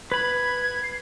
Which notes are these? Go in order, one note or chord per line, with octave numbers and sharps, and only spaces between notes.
B4 B5 G#6
C7